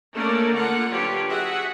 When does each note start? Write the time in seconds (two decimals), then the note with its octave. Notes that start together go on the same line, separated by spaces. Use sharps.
0.14 A3 A#3 C#4 D4 A#4 D5
0.54 D3 A#3 F4 F#5
0.90 D3 F#3 F4 G4 B4 C#5
1.27 F#4 G#4 E5 F#5